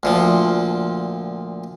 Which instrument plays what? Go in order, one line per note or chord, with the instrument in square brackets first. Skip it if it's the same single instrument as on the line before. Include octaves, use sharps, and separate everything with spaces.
[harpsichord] D2 A#2 F3